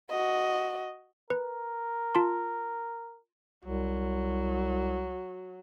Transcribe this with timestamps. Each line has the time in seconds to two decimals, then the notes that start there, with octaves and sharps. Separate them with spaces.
0.11 F#4 D#5
1.30 A#4 B4
2.15 F4 A5 C6
3.65 C2 F#3